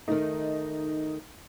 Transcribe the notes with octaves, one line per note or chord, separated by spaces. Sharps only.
D#3 A3 D#4